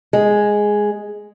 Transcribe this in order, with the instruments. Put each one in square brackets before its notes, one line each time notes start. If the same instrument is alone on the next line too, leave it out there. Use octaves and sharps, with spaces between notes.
[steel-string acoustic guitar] G#3